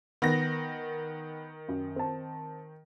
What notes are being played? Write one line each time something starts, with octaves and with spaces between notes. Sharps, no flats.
D#3 B3 A#6
F#2
C4 A5